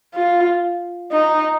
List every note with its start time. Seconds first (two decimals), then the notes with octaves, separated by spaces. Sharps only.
0.14 F4
1.12 D#4